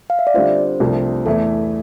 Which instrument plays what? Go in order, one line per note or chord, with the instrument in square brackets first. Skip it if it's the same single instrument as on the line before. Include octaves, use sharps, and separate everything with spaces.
[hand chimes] F5
E5
D5
[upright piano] D3 G3 C4 F4 [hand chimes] C5
[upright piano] C2 C3 F3 A3 D4
[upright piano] E2 E3 A3 E4 [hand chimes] A4